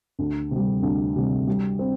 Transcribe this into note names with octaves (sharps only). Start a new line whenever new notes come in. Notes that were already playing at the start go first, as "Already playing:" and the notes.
D2
C3 G3
D2
C3 G3
G3
C4